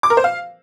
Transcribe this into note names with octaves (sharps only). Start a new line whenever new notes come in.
D6
A#4
C5
F5